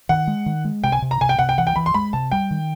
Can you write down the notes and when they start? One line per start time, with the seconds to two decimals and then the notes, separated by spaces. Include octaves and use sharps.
0.09 D#3 F#5
0.28 G#3
0.46 D#3
0.65 G#3
0.84 C3 G5
0.92 G#5
1.02 C3
1.11 A#5
1.21 C3 G#5
1.29 G5
1.39 C3 F#5
1.49 G5
1.58 E3 F#5
1.67 G5
1.76 E3 B5
1.86 C6
1.94 G#3 B5
2.13 C3 A5
2.32 G3 G5
2.51 D#3